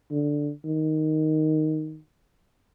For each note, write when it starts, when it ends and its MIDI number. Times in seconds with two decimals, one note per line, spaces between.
0.11 0.51 50
0.64 1.99 51